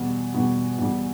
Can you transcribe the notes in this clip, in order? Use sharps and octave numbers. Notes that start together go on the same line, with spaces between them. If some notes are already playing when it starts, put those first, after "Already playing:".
Already playing: E2 B2 G3
E2 B2 G3
E2 B2 G3